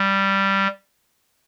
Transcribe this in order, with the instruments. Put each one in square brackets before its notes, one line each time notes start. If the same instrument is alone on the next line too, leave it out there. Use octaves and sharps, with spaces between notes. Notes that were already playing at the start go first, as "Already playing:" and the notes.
Already playing: [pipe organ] G3